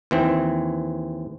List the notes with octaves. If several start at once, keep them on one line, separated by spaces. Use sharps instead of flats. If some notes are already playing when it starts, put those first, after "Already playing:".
D#2 E3 C4